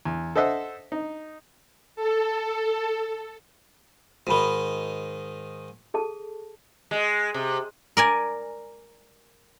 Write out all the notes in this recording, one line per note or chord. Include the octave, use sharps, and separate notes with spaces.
E2
A4 C5 D#5 E5 F#5
D#4
A4
G#2 D#3 F#4 B5
G#4 A4 A5
G#3
C3
A#4 D5 G#5